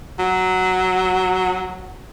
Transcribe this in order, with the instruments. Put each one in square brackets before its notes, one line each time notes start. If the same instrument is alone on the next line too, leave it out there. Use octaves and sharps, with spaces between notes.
[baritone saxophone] F#3